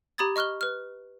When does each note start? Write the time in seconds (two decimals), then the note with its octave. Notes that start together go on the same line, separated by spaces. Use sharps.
0.18 G4 A#5 B5 D#6 G#6 A6
0.36 D#5 C#6 F6 F#6 G7
0.61 B4 F6